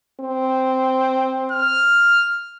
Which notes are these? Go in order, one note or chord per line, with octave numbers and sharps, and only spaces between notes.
C4
F6